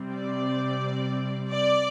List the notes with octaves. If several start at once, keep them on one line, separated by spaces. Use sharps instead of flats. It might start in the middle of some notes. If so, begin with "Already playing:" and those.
Already playing: C3 G3 C4
D5
D5